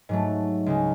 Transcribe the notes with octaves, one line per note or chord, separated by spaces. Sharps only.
G#2 F#3 A3
C#2 C#3 G#3